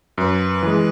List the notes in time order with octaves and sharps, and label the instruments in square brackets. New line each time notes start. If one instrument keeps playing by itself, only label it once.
[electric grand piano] F#2 [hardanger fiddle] B4
[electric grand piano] E3 G#3